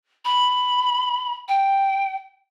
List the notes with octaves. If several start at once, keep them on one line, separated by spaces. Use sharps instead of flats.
B5
G5